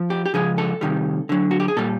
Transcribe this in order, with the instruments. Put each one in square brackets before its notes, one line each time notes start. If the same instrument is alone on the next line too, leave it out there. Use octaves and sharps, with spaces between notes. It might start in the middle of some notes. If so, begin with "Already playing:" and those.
Already playing: [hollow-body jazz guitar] F3
G4
G4
C#3 F3 G#3 G#4
A4
C3 D#3 G3
D3 F#3
F#4
G4
G#4
A#2 G3 A4